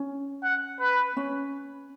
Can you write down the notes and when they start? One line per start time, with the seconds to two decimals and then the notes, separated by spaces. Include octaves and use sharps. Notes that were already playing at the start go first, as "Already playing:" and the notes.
Already playing: C#4
0.43 F#5
0.80 B4
1.17 C#4